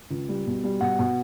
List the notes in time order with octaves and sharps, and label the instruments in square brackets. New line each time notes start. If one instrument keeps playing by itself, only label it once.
[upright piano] C#2
G3
B2
G3
B2 F#5
B2